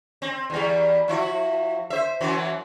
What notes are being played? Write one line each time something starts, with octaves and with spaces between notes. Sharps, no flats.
C4
E2 G3
F3 E4 F#4
C5 E5
F#2 E3 F#3